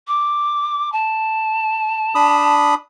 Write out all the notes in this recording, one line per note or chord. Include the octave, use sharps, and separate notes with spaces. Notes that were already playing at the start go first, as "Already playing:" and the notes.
D6
A5
D4 B5 D#6